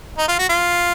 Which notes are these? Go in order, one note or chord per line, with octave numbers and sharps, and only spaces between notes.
D#4
F4
F#4
F4